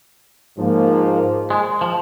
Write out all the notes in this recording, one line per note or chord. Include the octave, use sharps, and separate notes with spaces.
G#2 F3 A#3
G#3
F3